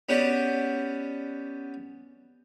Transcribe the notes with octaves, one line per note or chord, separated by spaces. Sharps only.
B3 C#4 F#4 G4 D5